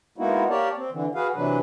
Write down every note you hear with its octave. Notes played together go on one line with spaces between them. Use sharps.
G#3 A#3 B3 D#4 E4 F#4
A#3 G4 A#4 C#5 D5 A5
C4
D3 E3
F#4 G#4 B4 F5
C3 E3 F#3 D4 B4